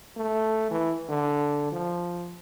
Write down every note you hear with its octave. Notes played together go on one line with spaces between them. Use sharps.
A3
E3
D3
F3